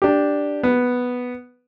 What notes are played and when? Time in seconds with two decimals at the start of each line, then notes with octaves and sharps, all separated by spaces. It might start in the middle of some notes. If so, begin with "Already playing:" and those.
0.02 D4 G4
0.63 B3